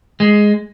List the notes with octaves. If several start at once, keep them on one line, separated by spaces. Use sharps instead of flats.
G#3